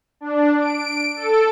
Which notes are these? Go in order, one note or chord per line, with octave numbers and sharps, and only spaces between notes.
D4
D7
A4